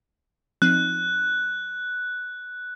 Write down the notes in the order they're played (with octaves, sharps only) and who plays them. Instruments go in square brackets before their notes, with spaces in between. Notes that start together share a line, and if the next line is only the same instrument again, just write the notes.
[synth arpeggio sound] F3 C4 D#4 [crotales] F#6